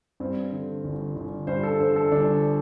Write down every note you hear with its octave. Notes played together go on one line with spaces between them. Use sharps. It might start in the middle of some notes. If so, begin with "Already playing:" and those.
G2 C4
D3
G1
G1
G2 C5
A4
D3 C5
A4
G1 D4